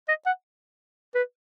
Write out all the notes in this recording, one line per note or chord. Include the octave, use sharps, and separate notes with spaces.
D#5
F#5
B4